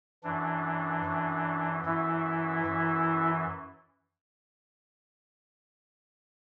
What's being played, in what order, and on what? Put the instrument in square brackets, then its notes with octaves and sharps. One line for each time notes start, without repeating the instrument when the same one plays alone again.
[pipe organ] F#2 E3 D4
F#2 E3
F#2 E3 E4
F#2 E3